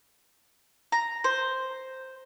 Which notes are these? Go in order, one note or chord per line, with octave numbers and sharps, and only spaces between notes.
A#5
C5